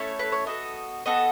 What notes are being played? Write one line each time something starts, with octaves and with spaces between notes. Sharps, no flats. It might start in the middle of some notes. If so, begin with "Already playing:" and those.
Already playing: A3 C#4 E4 A4 C#5
B4
C#5
B3 F#4 A4 D#5
B3 F#4 A4 D#5